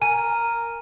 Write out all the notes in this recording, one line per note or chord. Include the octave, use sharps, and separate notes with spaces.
A#4 G#5 D#7